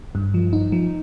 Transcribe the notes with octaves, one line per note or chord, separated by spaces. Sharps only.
G2
F3
D#4
F3